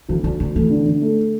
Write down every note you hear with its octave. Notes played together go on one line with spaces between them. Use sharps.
D2 E3
D2 D3
D2 D3
E3 A3
D3
D3
A3